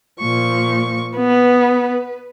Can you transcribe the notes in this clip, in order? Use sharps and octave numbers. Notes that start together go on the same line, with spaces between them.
A#2 F3 C#6
B3 B4